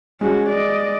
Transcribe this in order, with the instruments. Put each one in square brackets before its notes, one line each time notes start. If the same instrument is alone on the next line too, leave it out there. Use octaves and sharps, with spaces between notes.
[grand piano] G#3 [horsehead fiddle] C#4 F#4
[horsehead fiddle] D5 D#5